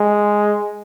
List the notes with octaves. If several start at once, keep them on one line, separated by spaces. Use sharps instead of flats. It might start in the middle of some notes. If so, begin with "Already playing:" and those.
Already playing: G#3